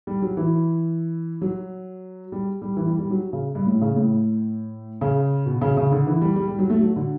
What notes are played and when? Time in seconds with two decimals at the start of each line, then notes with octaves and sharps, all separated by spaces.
0.07 G3
0.22 F#3
0.37 E3
1.42 F#3
2.32 G3
2.62 G3
2.77 E3
2.88 G3
2.99 G3
3.10 F#3
3.33 C#3
3.55 G2
3.67 A2
3.82 C#3
3.96 A2
5.01 C#3
5.46 B2
5.62 C#3
5.77 C#3
5.92 D3
6.07 E3
6.21 G3
6.36 G3
6.48 G3
6.59 F#3
6.70 A3
6.81 F#3
6.96 D3